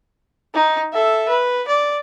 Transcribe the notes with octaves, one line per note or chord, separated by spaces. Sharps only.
D#4
A4 E5
B4
D5